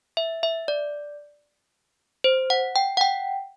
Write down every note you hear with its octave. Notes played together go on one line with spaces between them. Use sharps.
E5
E5
D5
C5
F#5
G5
F#5
G5